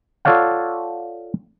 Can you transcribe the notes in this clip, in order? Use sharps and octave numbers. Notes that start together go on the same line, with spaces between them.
F4 A4 C#5 D5 F5 F#5